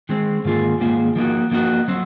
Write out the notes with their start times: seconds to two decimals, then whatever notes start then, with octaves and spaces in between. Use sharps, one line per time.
0.09 D#3 G#3 C4
0.45 G#2 D#3 A#3 F4 G#4
0.80 G#2 D#3 A#3 F4 G#4
1.16 F3 A#3 D#4 F#4
1.51 F3 A#3 D#4 F#4
1.88 F#3 C4